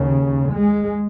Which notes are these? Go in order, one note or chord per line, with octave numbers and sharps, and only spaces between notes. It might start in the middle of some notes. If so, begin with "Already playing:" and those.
Already playing: D#2 C#3
G#3